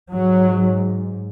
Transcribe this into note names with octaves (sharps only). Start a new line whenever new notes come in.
G#2 F#3